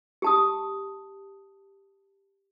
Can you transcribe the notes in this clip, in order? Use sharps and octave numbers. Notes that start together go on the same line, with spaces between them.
G4 A5 D#6